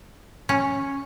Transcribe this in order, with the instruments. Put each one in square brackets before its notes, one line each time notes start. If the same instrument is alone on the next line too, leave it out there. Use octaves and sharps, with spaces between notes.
[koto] C#4